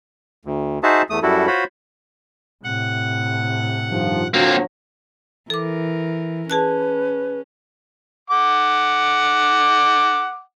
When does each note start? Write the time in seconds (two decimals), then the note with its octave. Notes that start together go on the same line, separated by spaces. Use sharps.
0.45 D2
0.83 D#4 F#4 G#4 C5 E5 A5
1.10 E2 A3 D#6
1.23 F#2 G3 E4 F#4 A4
1.47 F4 F#4 C5 C#5 B5
2.64 A2 C3 F#5
3.91 G2 D#3 F3
4.34 D3 F3 F#3 A#3 C4
5.50 E3 A4 A#4 D6
6.50 C#4 G#4 B4 A5 F#6
8.30 F#5 D6